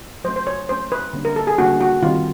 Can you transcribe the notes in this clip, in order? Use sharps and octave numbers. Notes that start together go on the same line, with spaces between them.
F#3 A3 C#4 C5
C5
C#5
F#3 A3 C#4 C5
B4
D3 G3 A#3 C#4
A#4
A4
G#4
D3 G3 A#3 C#4 F#4
F#4
D#3 G3 C4 F4